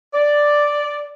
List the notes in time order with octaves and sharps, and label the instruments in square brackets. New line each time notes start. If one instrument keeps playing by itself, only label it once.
[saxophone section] D5